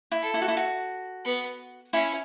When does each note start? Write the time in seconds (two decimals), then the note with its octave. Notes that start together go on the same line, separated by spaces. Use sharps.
0.12 E4
0.22 A4
0.34 E4
0.42 F#4
0.48 E4
0.57 F#4
1.25 B3
1.93 C#4 E4